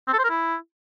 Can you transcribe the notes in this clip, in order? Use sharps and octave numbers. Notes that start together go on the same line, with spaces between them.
C4
A4
C5
A#4
E4